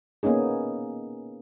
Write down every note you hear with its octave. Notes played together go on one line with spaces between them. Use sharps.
A#3 B3 C#4 D#4 G#4